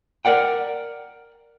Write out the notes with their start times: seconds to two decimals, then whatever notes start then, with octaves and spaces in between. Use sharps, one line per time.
0.25 A#4 D5 F#5 G5